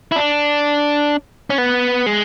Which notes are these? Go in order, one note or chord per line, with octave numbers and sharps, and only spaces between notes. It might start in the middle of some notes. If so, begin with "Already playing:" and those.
E4
D4
C#4
B3
G#3